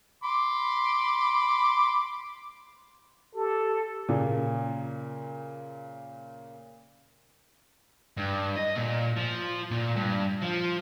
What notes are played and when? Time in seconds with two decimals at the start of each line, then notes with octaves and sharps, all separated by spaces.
0.24 B5 C6 D6
3.35 G4 A4
4.08 A#2 C#3
8.17 G2
8.56 D#5
8.75 A#2
9.17 F3
9.71 A#2
9.96 G2
10.42 F3